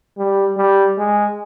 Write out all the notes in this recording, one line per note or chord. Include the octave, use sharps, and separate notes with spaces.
G3
G3
G#3